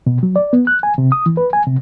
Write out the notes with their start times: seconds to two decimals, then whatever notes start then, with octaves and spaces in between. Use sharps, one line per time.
0.07 B2
0.23 F#3
0.36 D5
0.53 B3
0.67 F#6
0.83 G#5
0.98 C3
1.12 D#6
1.26 E3
1.37 B4
1.53 G#5
1.67 C3